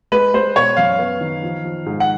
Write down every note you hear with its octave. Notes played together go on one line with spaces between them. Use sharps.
G#3 B4
G#3 C5
B2 C#5
F#2 F5
B3
D#3
F3
F3
G#2
F#5